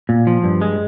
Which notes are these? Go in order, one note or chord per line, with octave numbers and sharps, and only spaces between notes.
A#2
F3
G2
G#3